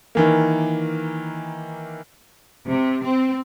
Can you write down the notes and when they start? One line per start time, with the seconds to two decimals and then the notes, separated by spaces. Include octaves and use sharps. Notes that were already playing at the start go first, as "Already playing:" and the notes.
0.15 D#3 E3 A#3
2.66 C3
3.04 C4